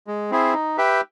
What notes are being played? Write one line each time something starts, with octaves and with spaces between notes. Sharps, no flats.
G#3
C4 E4 G#4
D#4
G4 B4 E5 G5